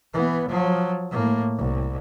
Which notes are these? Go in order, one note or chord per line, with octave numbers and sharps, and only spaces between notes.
E3 B3
F3 F#3
A2 A#3
C2